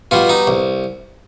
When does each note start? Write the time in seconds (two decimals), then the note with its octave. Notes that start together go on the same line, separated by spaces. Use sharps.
0.11 B2 G3 F4
0.29 D#4
0.47 C2